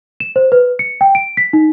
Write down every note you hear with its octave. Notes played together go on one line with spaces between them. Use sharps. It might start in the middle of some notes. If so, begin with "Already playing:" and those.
E7
C5
B4
C#7
G5
D7
B6
D#4